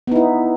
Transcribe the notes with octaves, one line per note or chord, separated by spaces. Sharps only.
B3 D#4 E4